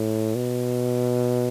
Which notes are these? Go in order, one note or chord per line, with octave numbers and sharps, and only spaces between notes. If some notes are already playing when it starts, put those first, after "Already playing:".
Already playing: A2
B2